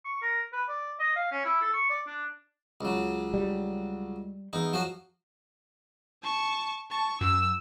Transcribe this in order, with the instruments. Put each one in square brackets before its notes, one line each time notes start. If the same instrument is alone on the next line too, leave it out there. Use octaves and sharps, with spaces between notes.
[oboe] C#6
A#4
B4
D5
D#5
F5
C#4
E4
A4
C#6
D5
D4
[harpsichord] C#2 F#3
[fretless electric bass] G3
[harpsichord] E2 D#4
F3 F#3 F#4
[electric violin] A5 C#6
[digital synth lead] A5 [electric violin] C#6
[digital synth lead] F#2 [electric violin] E6